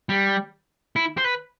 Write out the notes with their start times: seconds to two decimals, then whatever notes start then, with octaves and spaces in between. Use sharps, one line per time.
0.09 G3
0.96 E4
1.18 C5
1.25 B4